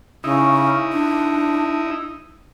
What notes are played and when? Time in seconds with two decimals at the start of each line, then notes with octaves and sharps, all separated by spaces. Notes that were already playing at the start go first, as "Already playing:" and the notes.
0.24 C#3 D#4 E4
0.92 D4